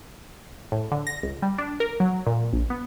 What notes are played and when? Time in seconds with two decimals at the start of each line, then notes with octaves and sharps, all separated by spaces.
0.72 A2
0.92 D3
1.07 A#6
1.23 C#2
1.42 G3
1.58 D4
1.80 A#4
2.00 F#3
2.27 A#2
2.53 A#1
2.70 B3